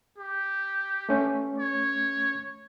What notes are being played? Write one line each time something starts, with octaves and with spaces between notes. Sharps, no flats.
G4
A3 C#4
C#5